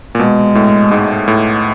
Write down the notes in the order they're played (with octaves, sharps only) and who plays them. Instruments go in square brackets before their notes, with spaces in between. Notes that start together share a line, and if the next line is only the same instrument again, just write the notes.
[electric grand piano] A#2
[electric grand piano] B2 [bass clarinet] G#3
[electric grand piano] A2
G#2
A2